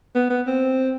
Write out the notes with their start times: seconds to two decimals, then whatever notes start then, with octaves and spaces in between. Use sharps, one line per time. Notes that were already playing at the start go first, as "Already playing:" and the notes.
0.15 B3
0.30 B3
0.47 C4